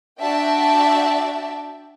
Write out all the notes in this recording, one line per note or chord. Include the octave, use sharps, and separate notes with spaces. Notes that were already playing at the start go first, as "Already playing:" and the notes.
D4 F#4 D5 E5 G5 A5